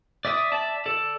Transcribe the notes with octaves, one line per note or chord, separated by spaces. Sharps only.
D5 E5 D6 D#6
D5 E5 A5
A4 D5